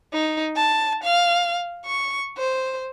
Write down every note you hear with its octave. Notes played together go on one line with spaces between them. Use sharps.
D#4
A5
F5
C#6
C5